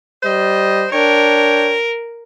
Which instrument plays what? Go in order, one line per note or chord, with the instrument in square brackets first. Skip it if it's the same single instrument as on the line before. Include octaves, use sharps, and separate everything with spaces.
[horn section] G3 C5 D#5
[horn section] D4 C#5 G5 [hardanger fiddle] A#4